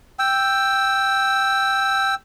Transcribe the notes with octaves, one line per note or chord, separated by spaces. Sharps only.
G5 E6